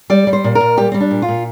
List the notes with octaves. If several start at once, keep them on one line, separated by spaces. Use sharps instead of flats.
G3 D5
G3
C5
A#2
A#4
A#2
G3 G4
G3 C4
D4
A#2
F4
A#2